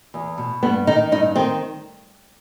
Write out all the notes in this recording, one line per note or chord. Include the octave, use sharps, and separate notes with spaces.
E2
B2
G2 B3
D#3 D#4
G2 D#4
D#3 C4